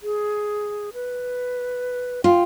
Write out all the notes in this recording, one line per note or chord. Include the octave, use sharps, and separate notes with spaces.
G#4
B4
F4 G5